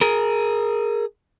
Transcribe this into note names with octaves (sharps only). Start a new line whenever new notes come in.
G#4 A#4